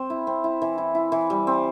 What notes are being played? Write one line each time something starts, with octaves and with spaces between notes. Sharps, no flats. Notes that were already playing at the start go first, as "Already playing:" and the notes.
Already playing: C4
E4
C4
E4
E3
E4
E4
E3
G3
C4